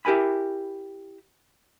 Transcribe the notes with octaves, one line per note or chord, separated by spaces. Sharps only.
E4 G4 A#4 G#5 B5